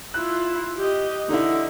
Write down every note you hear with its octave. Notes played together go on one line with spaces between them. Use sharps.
E4 F4 F#6
G4 D#5
D3 D#4 E4